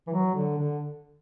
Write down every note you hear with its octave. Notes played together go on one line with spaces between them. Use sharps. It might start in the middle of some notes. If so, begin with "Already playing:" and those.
E3
F#3
D3
D3